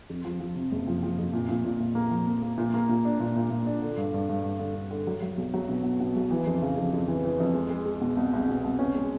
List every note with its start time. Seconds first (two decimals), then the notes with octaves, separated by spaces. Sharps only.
0.10 F2
0.25 F3
0.40 F3
0.56 C3
0.72 F#1
0.87 F3
1.03 F3
1.19 F2
1.33 A#2
1.49 A#2
1.65 A#2
1.80 A#2
1.95 A#3
2.11 F3
2.27 A#3
2.42 A#3
2.58 A#2
2.74 A#3
2.89 A#2
3.05 D4
3.20 A#2
3.36 A#2
3.50 A#2
3.67 D4
3.82 D3
3.97 G2
4.14 G2
4.29 G2
4.44 G2
4.59 D3
4.75 D3
4.91 D3
5.07 F#3
5.22 F#3
5.38 B1
5.54 F#3
5.69 B2
5.84 B2
6.00 B2
6.16 B1
6.31 E3
6.47 F2
6.62 C#3
6.78 F2
6.94 F2
7.08 E3
7.25 E3
7.40 F2
7.55 G#3
7.70 G#3
7.86 G#3
8.01 B2
8.17 C2
8.33 C2
8.49 B2
8.64 C2
8.79 C#4
8.95 G#3